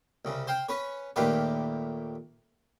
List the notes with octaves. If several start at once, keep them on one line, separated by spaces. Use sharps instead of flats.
C2 C#3
C5 F5 G5
C#4 B4 C#5
D#2 A#2 A3 G4 B4 F5